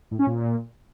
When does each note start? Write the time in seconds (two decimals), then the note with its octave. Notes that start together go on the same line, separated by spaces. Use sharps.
0.11 A2
0.19 C#4
0.27 A#2